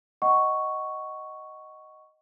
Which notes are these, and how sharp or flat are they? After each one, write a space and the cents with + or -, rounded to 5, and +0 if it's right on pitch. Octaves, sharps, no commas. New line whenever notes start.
D#5 +0 F#5 +20 C#6 +5